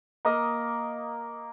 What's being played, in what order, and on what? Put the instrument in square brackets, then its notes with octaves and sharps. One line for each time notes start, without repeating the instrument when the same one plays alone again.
[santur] A#3 D#5 D#6